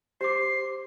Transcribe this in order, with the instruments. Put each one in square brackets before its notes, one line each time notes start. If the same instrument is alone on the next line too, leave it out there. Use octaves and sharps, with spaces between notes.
[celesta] G4 D6 [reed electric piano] C5 [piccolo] C7